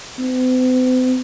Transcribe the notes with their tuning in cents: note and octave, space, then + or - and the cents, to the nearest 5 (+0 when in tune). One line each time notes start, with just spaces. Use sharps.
C4 -45